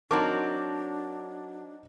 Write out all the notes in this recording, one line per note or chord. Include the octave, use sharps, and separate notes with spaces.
F#3 C4 D4 D#4 A#4 A5 D6